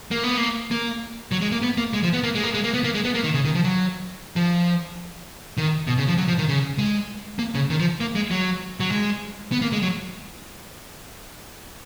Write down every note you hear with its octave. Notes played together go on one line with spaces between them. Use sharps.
A#3
B3
A#3
A#3
F#3
G#3
A#3
B3
A#3
G#3
F3
B3
A#3
G#3
A#3
G#3
A#3
B3
A#3
G#3
B3
A#3
D#3
C#3
D#3
F3
F#3
F3
D#3
B2
C#3
F3
F#3
F3
D#3
C#3
G#3
A#3
C#3
D#3
F3
A#3
G#3
F#3
F#3
G#3
B3
A#3
G#3
F#3